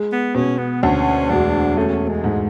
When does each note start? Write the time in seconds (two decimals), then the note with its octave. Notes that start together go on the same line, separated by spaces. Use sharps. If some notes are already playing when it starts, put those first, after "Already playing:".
Already playing: G#3
0.12 B3
0.35 B2 C#4
0.58 B3
0.82 D2 C#4
1.30 E1 D4
1.77 A3 C#4
2.08 G#3
2.24 G#2